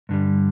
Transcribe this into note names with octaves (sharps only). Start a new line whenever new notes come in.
G2 D3 G3